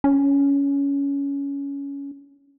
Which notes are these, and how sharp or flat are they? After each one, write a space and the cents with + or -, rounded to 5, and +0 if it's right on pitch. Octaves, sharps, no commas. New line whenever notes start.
C#4 +15